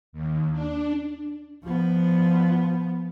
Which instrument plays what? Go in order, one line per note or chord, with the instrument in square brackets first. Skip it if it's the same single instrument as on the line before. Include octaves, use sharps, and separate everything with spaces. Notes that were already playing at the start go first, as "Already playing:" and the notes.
[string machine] D#2
D4
[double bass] F3 B3